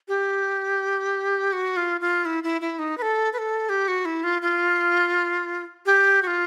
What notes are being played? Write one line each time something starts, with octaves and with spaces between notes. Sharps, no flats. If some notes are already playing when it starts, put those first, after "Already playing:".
G4
F#4
F4
F4
E4
E4
E4
D#4
B4
A4
B4
A4
G4
F#4
E4
F4
F4
G4
F#4
F4